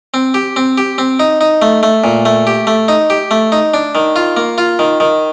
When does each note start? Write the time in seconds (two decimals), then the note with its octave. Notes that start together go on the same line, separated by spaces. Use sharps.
0.14 C4
0.34 G4
0.56 C4
0.78 G4
0.98 C4
1.20 D#4
1.41 D#4
1.62 A3
1.83 A3
2.04 A#2
2.25 A3
2.47 G4
2.67 A3
2.88 D#4
3.10 G4
3.31 A3
3.52 D#4
3.74 D4
3.95 D#3
4.16 F4
4.37 A#3
4.58 F4
4.79 D#3
5.00 D#3